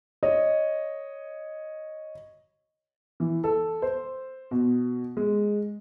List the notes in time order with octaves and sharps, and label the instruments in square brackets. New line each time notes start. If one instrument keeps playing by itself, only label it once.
[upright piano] C#5 D#5
E3
A4
C5
B2
G#3